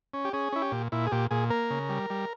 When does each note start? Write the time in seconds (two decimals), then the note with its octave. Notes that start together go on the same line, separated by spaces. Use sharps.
0.14 C#4
0.25 G4
0.33 C#4 G#4
0.53 C#4 E4
0.62 G4
0.72 A#2
0.92 A#2 E4
1.06 G#4
1.12 A#2 G4
1.31 A#2 G#4
1.50 A#3 A#4
1.70 C#3
1.89 G3
2.10 G3